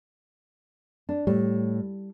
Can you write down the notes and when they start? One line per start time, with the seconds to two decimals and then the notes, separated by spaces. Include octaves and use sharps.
1.09 D4
1.27 A2 G3